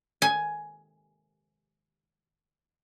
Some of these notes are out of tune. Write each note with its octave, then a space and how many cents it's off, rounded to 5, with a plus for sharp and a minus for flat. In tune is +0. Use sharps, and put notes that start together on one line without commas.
G#5 +10